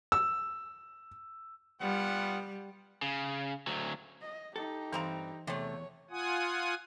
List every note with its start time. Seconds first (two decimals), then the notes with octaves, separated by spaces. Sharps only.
0.12 E6
1.81 G3 B3 F4 F#5
3.02 C#3
3.67 D2 F#3
4.21 D#5
4.56 D#4 G4 A4
4.92 G2 E3 C4 A#5 C6
5.47 E2 C3 A3 C#5
6.11 F4 F#5 G#5 D#6